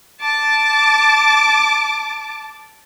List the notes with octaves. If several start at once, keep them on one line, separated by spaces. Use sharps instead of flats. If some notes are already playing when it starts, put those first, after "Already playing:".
A5 D6